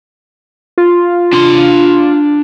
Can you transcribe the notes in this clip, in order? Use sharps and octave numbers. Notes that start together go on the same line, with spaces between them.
F4
D4 C6